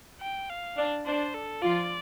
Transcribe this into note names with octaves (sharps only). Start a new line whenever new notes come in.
G5
F5
D4
D4 C5
A4
F3 F4 D5